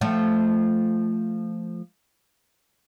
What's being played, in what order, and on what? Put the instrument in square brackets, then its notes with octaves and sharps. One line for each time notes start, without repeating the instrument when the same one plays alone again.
[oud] F3 A3